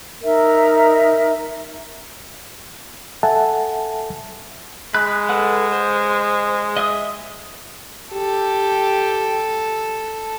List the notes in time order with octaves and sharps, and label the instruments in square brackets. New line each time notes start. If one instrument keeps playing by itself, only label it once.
[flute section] D#4 A#4 E5
[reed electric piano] A4 E5 F#5 G#5 A5
[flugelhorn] G#3 [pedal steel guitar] B5 F#6
[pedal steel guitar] A4 B4 F#5
C5
D#5 E5 D#6
[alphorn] G4 [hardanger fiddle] A4